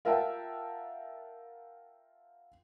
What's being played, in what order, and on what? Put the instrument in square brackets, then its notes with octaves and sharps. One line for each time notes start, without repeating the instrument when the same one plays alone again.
[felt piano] F4 A#4 E5 F#5 G5 A5